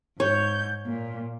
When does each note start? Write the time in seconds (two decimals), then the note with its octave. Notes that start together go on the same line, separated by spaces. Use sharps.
0.20 G#2 C#5 G6
0.86 A#2